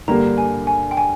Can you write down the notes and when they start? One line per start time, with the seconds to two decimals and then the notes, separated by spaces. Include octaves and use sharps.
0.08 G2 D3 G3 A#3 A#5
0.38 G#5
0.67 G#5
0.91 G5
0.97 G#5